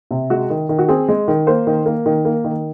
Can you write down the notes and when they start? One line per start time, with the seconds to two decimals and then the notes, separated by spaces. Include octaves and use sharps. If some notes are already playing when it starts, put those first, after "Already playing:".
0.11 C3
0.30 G#3 F#4
0.50 D#3
0.69 D#3
0.79 F#4
0.88 C4 G#4
1.09 G#3
1.28 D#3
1.47 A#3 C5
1.67 D#3
1.86 A#3
2.06 D#3
2.25 A#3
2.44 D#3